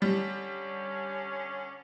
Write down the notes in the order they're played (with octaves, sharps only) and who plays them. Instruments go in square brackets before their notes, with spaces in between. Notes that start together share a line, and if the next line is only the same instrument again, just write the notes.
[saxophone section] D3 C#4 [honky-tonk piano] G3